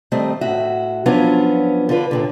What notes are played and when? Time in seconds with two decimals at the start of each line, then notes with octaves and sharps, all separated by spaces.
0.12 D#3 G3 A3 C4 D#5
0.41 A2 F#4 E5
1.06 F3 F#3 B3 C#4 D4 F4
1.89 D3 D4 F4 B4
2.11 D#2 A#2 D3